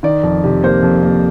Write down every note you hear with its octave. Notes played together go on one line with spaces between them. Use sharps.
D#3 D5
F2
C3
A#3 C5
F2
A#3